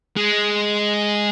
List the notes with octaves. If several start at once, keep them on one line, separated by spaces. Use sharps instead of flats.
G#3